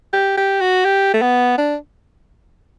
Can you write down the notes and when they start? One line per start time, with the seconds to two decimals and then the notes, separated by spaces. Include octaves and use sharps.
0.13 G4
0.37 G4
0.61 F#4
0.85 G4
1.14 A3
1.22 B3
1.58 D4